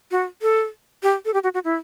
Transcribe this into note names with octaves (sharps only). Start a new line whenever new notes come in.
F#4
A4
G4
A4
G4
F#4
F#4
E4